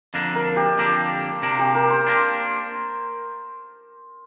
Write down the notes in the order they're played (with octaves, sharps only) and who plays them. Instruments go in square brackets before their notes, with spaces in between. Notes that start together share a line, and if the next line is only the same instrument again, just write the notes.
[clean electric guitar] F2 D3 A#3 D4
[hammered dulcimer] A#4
G4
[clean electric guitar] F2 D3 A#3 D4
C3 A#3 D4
[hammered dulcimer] G4
A#4
C5
[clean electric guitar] A#3 D4